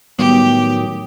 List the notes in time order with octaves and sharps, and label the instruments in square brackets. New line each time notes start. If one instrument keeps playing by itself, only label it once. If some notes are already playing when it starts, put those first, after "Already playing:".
[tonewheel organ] A2 D#3 F#3 [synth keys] G3 B3 D#6 [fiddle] G4